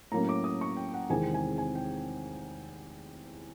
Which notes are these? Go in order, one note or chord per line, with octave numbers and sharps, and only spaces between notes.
A2 F#3 A#3 C#4 A#5
D6
D#6
C#6
G5
F#5
E2 C3 D#3 G#3 C4 G#5
G#5
G#5
G5